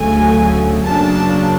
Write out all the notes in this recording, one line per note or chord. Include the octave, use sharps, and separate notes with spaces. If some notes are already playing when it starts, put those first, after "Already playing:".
Already playing: D2 C#3 F#3 A3 G#5
F#2 C#3 F#3 A#3 D4 A5